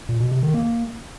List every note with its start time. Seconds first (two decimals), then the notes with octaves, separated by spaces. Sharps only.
0.09 A#2
0.20 B2
0.31 C3
0.43 D#3
0.54 A#3